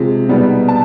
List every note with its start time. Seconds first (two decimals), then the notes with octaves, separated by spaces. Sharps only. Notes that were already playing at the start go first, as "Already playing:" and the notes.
Already playing: C3 F3 G#3
0.28 B2 G3 B3 D#4
0.68 A5